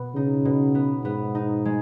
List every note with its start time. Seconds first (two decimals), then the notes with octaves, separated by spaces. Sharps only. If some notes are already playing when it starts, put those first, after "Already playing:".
Already playing: B2 B3
0.15 C#3 D#4
0.45 B2
0.75 B3
1.05 G#2 B3
1.35 D#4
1.65 G#3